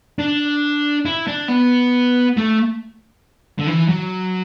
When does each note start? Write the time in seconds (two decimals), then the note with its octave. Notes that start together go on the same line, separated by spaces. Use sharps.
0.19 D4
1.06 E4
1.27 D4
1.48 B3
2.37 A3
3.59 D3
3.67 E3
3.89 F#3